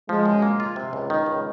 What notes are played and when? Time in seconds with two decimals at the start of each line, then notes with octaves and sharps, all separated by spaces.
0.08 F3 G#3
0.26 F#2
0.42 A#3
0.60 F4
0.76 C3
0.93 C#2
1.10 D#3
1.26 C#2